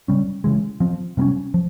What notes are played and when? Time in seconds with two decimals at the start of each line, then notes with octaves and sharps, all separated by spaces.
0.08 C#3 G3 C#4
0.44 C#3 E3 G#3
0.80 F3 C4
1.17 C3 G3 A#3 C#4
1.54 F3